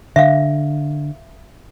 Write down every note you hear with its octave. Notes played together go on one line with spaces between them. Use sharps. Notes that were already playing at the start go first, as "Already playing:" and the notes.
D3 E5 F5